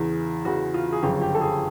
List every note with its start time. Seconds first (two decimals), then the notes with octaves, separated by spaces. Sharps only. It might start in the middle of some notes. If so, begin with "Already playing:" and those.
Already playing: E2 C#3 E3
0.45 E2 C#3 E3 F#4
0.74 F4
0.92 G#4
1.03 G1 F#2 C#3 F3 G4
1.21 G4
1.35 A4
1.41 G#4